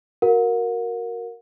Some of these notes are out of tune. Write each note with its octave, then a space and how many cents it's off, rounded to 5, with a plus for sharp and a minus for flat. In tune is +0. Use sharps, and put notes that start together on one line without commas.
F#4 +0 A#4 +0 F#5 -40